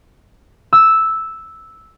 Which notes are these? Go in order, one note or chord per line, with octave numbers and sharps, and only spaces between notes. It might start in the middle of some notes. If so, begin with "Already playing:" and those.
E6